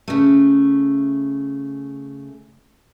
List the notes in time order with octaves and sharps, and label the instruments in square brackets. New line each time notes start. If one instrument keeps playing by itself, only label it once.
[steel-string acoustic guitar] C#3 A3